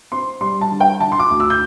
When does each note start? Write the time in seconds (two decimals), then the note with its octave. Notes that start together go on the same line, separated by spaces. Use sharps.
0.12 C4 C6
0.41 G3 C6
0.61 A5
0.71 D3
0.80 G5
1.00 D3 A5
1.12 C6
1.20 D6
1.30 D2
1.40 E6
1.50 G6